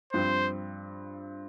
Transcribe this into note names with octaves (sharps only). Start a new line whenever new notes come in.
G2 F3 C4 C5